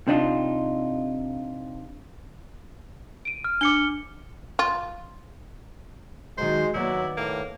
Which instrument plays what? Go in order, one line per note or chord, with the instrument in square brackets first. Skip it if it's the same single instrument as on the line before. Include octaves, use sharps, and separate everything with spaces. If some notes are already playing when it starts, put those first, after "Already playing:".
[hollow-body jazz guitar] C3 D4 D#4 F4
[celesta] D7 D#7
[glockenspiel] F6
[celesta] D4 D6 [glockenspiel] C#7 G7
[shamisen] F4
[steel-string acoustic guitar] D#3 F#3 [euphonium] G#3 [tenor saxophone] C5
[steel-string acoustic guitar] D#2 B3 D5 [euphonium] F#3 [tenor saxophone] E4
[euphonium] A2 [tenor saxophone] A#3